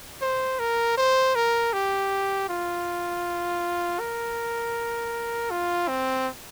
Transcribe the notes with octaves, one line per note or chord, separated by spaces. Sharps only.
C5
A#4
C5
A#4
G4
F4
A#4
F4
C4